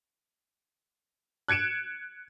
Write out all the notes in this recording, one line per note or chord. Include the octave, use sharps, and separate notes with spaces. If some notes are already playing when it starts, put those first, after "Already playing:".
F#6 G#6 C#7 D7 E7